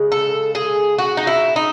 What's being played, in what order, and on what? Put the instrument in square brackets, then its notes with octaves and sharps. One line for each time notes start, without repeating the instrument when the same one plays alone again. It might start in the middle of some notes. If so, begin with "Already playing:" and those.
Already playing: [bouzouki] C#3 G#3
A4
G#4
F#4
D#4
E4
D#4